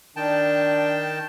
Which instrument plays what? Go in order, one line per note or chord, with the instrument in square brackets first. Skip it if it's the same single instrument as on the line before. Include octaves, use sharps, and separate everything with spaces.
[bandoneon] D#3 G5 A5 [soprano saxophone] D4